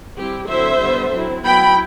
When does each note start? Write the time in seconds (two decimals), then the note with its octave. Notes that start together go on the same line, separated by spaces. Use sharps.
0.18 G3 C4 E4 G4
0.50 D3 F#3 C4 E4 C5 E5
0.81 D3 G3 B3
1.13 F#3 C4 E4
1.45 F#3 B3 E4 G5 B5